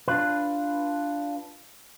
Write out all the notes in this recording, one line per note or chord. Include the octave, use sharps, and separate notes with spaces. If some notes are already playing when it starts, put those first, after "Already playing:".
D4 F4 B4